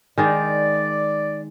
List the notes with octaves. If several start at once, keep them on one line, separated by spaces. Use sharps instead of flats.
D#3 G#3 D#4 D5